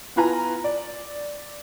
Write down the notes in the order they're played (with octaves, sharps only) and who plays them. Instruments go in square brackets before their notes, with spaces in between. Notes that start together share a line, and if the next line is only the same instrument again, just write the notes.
[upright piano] B3 E4 F4 B4 G#5 A#5
D5